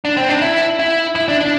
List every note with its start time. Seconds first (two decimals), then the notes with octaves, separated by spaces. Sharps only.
0.05 D4
0.17 C4
0.29 D4
0.42 E4
0.79 E4
1.16 E4
1.28 D4
1.41 D4